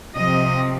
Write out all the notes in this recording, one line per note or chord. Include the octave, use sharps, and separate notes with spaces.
C3 F3 C4 D#5